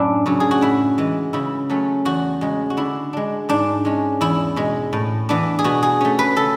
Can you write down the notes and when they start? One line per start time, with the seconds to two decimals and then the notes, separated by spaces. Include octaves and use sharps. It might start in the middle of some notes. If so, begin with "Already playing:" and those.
Already playing: F#2 A2 F#3 D4 E4
0.26 C#3 F#3 C#4
0.40 G#4
0.51 F#4
0.61 A2 E4
0.98 E3 G#3
1.33 C#3 E4
1.70 F#3 A3 C#4
2.05 E2 F#4
2.41 C#3 G#3
2.70 F#4
2.77 D3 E4
3.13 G#3 D4
3.49 G#2 D4
3.85 G#3 C#4
4.21 E2 E4
4.56 B2 G#3
4.93 A2
5.29 E3 B3 D4
5.59 G#4
5.64 B2 F#4
5.83 G#4
6.01 A3 C#4
6.19 B4
6.36 C#3 A4